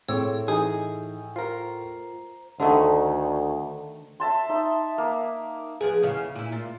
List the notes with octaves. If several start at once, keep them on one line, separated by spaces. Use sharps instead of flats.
A2 C4 G#4 C#5 D6 E6
E3 D#4 G4 G#4
F4 A#4 C5 A#5
D2 D3 D#3 A3
E5 A5 C6
D#4 E5
A#3
F3 B3 G#4
E2 C#3 F5
A#2 E4
A#2 F4